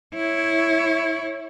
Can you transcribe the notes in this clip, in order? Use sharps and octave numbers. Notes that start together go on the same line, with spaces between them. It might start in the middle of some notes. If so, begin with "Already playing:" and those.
E4 C#5